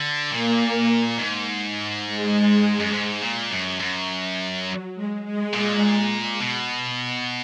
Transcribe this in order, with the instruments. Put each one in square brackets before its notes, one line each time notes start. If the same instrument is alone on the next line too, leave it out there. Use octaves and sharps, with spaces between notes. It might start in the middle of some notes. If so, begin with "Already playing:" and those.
Already playing: [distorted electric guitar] D3
[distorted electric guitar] A#2 [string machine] A#3
[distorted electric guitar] G#2
[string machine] G#3
[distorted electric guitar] F#2
G#2
A#2
F#2
F#2
[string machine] F#3
G#3
G#3
[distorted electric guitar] A#2
B2